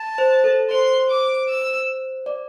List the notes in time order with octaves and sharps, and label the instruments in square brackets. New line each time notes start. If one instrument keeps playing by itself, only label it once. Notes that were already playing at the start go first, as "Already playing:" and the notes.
Already playing: [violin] A5
[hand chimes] C5
A4
[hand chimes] C5 [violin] C6
[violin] D6
E6
[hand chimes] D5